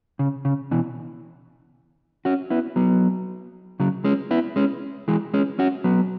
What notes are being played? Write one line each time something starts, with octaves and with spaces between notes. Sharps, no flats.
C#3
C#3
B2 E3
C#4 F#4
B3 E4
F#3 B3
C#3 F#3
G#3 C#4
B3 E4
G#3 C#4
E3 G#3
G#3 C#4
C#4 F#4
F#3 B3